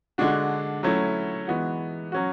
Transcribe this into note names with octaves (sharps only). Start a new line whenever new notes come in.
D3 G#3 D4 F#4
F#3 A3 C#4 E4
E3 G#3 B3 F#4
F#3 C#4 F#4